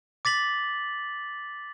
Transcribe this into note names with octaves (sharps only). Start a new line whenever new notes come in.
D6 A6 B6 F#7